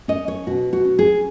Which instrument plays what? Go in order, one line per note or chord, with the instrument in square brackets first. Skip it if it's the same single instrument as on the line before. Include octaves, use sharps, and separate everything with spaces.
[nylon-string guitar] C#4 D#5
C#5
B2 F#4
F#4
C#4
G#4